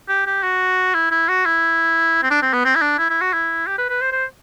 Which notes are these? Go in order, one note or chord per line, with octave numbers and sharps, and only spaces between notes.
G4
G4
F#4
E4
E4
F#4
E4
C4
D4
C4
B3
C4
E4
D4
E4
E4
F#4
E4
G4
B4
B4
C5
C5